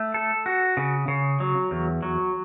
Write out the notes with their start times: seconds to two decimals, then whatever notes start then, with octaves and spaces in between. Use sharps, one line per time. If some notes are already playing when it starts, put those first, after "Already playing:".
Already playing: A3
0.14 A4
0.46 F#4
0.77 C#3
1.08 C#3
1.40 F#3
1.71 E2
2.02 F#3